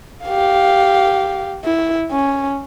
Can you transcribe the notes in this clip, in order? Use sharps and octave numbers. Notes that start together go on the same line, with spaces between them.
G4 F5
E4
C#4